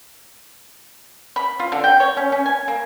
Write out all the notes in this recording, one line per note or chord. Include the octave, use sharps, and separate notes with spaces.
B5
F4
D3
G5
C#5
C#4
C#4
G#5
A#3